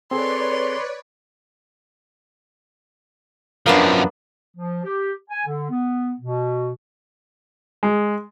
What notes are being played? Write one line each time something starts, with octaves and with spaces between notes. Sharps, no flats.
C4 G#4 A4 B4 C#5 D5 C6
F#2 F3 A#3 B3 D4
F3
G4
G#5
D3
B3
B2
G#3